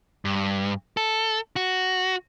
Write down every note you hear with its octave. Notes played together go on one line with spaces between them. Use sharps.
G2
A4
F#4